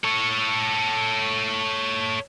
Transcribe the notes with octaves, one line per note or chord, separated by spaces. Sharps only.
A4 C#5